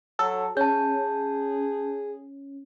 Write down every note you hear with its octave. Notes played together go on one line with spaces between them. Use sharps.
F#3 A4
C#4 G#4 A5 G6